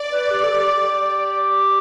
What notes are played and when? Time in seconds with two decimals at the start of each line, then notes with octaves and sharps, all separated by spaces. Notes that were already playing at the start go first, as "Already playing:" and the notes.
Already playing: D5
0.12 B4
0.31 G4
0.44 A4
0.52 G4